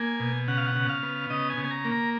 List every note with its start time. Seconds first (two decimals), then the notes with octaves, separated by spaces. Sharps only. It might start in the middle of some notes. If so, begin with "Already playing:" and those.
Already playing: A#3 G#5
0.20 B2
0.48 C#3 F#5
0.57 F5
0.67 F#5
0.75 C#3
0.89 F5
1.03 B3
1.30 C#3 D#5
1.50 G#5
1.57 C#3
1.64 G#5
1.71 A#5
1.85 A#3
1.92 A#5